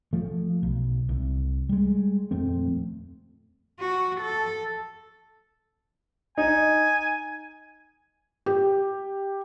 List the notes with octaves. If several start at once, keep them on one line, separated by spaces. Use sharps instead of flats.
F3 A3
B1
C2
G3 G#3
D#1 F2 A3 C4
F#4
A4
D#4 G#5
G4